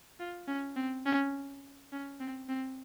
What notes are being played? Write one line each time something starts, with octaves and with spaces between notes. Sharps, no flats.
F4
C#4
C4
C#4
C#4
C4
C4